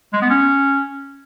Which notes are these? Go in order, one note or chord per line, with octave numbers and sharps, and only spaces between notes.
G#3
B3
C#4